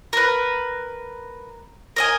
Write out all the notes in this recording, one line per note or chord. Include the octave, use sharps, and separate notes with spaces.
A#4 B4
A#4 D#5 G#5